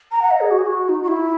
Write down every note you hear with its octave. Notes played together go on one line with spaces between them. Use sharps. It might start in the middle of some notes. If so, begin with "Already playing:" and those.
A#5
F#5
D#5
G#4
F#4
G#4
F#4
D#4
F#4
E4